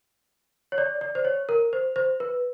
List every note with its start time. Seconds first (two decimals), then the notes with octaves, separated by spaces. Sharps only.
0.72 C#5
0.78 D5
1.01 D5
1.15 C5
1.25 C#5
1.49 A#4
1.73 C5
1.96 C5
2.20 B4